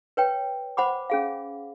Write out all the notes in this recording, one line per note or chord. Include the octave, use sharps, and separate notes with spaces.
B4 C#5 G5
C5 F#5 B5 D6
C#4 G#4 F5